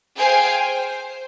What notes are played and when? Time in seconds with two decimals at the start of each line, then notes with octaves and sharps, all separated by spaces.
0.16 G#4 C5 F5 G5 G#5
0.67 C5